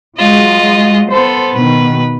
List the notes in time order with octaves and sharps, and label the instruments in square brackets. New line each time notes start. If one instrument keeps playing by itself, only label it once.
[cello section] F#3 G#3 [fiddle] F4 D#5
[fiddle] B3 A4 [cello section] C5
[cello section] B2 D#3 [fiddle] B4